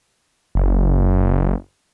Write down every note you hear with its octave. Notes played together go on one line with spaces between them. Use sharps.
F#1